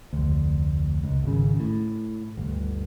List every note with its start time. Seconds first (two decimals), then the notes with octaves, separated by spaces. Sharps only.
0.13 F1 D2
1.03 C#2
1.24 G#1 C#3
1.60 A2
2.37 G1 D2